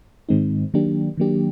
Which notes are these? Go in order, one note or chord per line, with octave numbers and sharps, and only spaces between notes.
G#2 D#3 G#3 C4 D#4
D#3 F#3 A#3 D4 G4
D#3 F#3 A#3 D4 G4